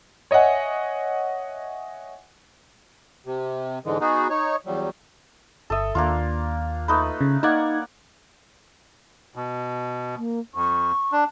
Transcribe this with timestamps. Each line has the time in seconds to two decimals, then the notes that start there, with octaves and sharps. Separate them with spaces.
0.31 C#5 D#5 E5 F#5 G#5
3.26 C3
3.85 G#2 D3 E3 G#3
4.01 B3 D#4 F#4 G#4
4.30 D#4 C#5
4.66 E2 F#3 G3
5.70 G1 A4 E5 D#6
5.95 D#2 A#3 D4 F4
6.88 A3 D#4 B4
7.21 C#3
7.43 A#3 D#4 D5 F#5 G#6
9.35 B2
10.17 A#3
10.55 F2 C#6
11.12 D4